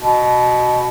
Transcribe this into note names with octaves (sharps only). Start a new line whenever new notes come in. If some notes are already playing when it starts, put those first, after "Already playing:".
B2